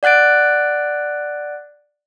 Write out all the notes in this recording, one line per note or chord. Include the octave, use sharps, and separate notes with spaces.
D5 F#5 F#6 A6 D7